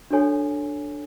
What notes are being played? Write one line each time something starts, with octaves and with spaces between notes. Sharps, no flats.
D4 F#4 A4 C#5 G#5